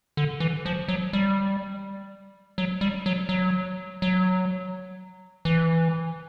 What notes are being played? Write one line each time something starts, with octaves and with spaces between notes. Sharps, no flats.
D3
E3
F3
F#3
G3
F#3
G3
F#3
F#3
F#3
E3